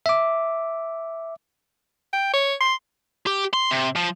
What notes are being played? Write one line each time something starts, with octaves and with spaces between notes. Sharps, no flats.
E5 D6
G5
C#5
C6
G4
C6
C3
F3